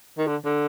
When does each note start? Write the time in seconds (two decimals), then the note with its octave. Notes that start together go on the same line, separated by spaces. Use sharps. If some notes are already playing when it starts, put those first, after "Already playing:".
0.18 D#3
0.27 D3
0.45 D3